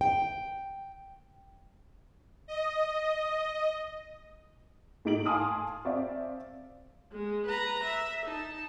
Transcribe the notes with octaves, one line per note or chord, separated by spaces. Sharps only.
G5
D#5
A2 D#4 D7 F#7
F5 G#5 A5 C6 D#6 F6
C4 D5 E5 F5
G#3
B4 A#5
E5
D#4 A5